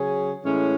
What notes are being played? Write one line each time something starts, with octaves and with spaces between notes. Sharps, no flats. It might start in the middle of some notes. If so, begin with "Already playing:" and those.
Already playing: C#3 F#3 C#4 G#4
A2 E3 G#3 C#4